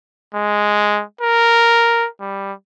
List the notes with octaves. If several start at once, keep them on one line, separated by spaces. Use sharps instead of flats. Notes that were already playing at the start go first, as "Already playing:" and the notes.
G#3
A#4
G3